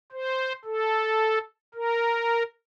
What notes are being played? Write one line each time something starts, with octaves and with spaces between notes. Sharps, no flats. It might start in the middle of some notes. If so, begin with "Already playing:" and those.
C5
A4
A#4